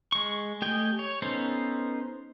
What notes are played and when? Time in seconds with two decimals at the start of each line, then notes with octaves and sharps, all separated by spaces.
0.12 G#3 C#6
0.62 A3 G4 D#5 G5 G#5
0.99 C#5
1.22 B3 C#4 D#4 A4 C5